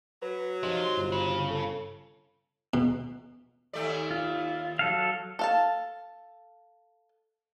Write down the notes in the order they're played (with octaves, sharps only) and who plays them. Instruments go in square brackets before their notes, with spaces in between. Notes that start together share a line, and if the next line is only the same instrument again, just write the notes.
[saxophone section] F#3 [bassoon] B4
[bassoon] C3 [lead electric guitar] F3 [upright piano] D#4
[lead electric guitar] F4 C6
[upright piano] G1
[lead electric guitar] C#3
[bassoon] A4
[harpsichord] B2
[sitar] D#2 A3 D5
[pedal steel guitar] F4
F#3 A4 F5
[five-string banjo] A4 F5 A5